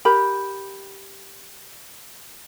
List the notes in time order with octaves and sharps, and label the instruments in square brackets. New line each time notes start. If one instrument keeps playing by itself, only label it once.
[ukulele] G4 A#4 B5